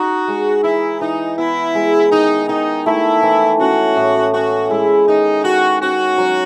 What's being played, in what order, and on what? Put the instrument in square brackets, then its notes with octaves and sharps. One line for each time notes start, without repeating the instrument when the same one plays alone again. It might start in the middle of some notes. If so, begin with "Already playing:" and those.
Already playing: [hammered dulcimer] D#4 [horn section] F#4
[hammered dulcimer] G#3
[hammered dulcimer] E3 [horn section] E4
[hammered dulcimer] E3 [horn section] D#4
[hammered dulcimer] B3 [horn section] E4
[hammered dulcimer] G#3
[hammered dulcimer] D#3 [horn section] D#4
[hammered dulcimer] D#3 [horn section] D#4
[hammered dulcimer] A3 [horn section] E4
[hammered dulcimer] E3
[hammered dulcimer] C#4 [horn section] F#4
[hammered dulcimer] A2
[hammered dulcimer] C#4 [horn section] F#4
[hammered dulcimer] G#3 [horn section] E4
[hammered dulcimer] D#3 [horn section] D#4
[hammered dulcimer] D#3 [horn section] F#4
[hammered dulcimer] C#4 [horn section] F#4
[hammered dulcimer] F#3